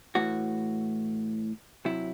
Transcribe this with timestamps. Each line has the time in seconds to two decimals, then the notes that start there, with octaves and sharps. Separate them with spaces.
0.15 A2 E3 F#4
1.85 C3 F#3 E4